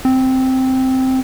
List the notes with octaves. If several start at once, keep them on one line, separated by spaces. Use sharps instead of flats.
C4